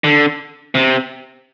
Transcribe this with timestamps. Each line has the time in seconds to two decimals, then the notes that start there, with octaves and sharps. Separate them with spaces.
0.04 D3
0.75 C3